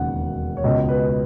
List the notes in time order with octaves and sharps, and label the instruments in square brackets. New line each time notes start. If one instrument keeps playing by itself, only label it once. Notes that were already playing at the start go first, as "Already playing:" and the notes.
Already playing: [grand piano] E1 D#2 C#3 F#5
C#5
C#2 B2 D#5
B4